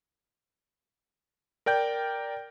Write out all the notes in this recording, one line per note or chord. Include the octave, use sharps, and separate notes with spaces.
A#4 D5 G5 G6